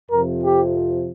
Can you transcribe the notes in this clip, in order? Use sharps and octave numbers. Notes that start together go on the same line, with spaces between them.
F2 C3 F3 A#4
G4